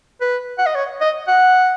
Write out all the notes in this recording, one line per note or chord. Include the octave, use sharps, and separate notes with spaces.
B4
F#5
D#5
C#5
D#5
F#5